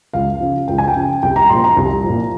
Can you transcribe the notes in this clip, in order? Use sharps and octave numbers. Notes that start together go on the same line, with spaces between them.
C#2 F5
C#3 F3
C#2 G5
G#5
G5
C#3 F3
C2 G5
A#5
A#2 F3 C6
A#5
C2
A#2 F3